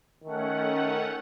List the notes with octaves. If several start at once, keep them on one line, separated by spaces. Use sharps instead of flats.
D#3 A3 C#4 F#5